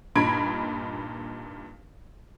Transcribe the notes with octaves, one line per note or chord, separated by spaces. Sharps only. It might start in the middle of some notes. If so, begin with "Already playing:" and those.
G2 A#2 D#4 B5 G#6 D7